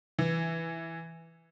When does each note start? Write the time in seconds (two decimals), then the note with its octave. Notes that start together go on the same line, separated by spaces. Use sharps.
0.19 E3